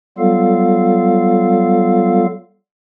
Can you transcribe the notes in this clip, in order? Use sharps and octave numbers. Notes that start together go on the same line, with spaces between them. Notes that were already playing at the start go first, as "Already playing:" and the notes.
F#3 G3 B3 F4 A4 F5